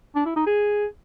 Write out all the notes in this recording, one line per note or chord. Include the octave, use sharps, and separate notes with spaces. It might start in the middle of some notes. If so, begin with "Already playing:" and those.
D4
E4
D#4
G#4